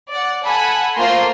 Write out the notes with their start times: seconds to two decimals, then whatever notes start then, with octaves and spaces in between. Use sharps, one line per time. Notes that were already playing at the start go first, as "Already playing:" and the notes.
0.11 D5 F#5
0.44 A4 F#5 G#5 B5
0.96 A3 A#3 F4 C5 A#5 C6